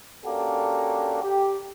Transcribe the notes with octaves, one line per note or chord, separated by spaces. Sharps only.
A#3 C#4 D4 F#4 G4 A4
G4